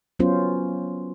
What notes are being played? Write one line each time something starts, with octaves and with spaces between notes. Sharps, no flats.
F#3 B3 C#4 F4 C5